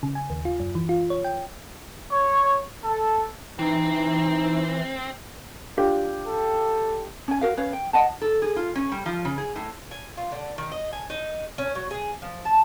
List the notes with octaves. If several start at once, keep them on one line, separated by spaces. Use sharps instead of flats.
C#3
G#5
D#2
F4
F#2
E3
F4
C#5
G5
C#5
A4
E3 C4 D#4
D4 F4 G4
A4
C#4 G#5
F#4 A#4 F5
C#4 B4 C#5 F5
G5
D#5 F#5 A5
A4
G#4
F4
C#4
G3
F3
C#3
G#4
A2
G#5
F4
D3
D#3
D#5
G#5
D#4
C#4
F#3
G#4
F3
A5